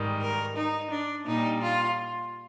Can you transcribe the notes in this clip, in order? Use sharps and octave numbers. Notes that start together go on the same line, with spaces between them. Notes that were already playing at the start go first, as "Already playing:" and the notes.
Already playing: G#2 D#3 G3
A#4
D#4
D4
A#2 G3 D#4
F4